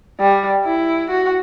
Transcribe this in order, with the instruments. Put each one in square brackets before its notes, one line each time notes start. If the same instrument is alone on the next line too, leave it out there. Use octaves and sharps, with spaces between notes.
[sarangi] G3
E4
F#4